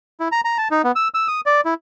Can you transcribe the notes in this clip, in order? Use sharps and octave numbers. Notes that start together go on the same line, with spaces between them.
E4
A#5
A#5
A5
D#4
B3
E6
E6
D#6
D5
E4